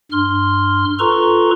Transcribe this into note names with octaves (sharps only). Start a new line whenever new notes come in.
G2 C6 F6
F4 A4 B4 A#5 C6 C#6